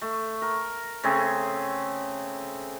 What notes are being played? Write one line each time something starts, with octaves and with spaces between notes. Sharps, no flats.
A3
A#4
C#3 A3 C4 G#4